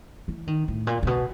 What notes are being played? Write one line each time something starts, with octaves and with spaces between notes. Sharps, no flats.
E3
D#3
A2
A#2
A#2
B2